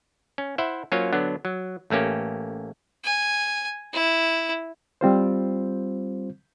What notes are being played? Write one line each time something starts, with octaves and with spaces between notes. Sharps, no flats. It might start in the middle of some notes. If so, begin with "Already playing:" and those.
C#4
E4 C5 E5 F#5
F#3 A#3 C#4 F4 C5 C#5
D3 F#3 B3 D4
F#3
A1 A3 A#3 C#4 G4
G#5
E4
G3 C4 F4 C5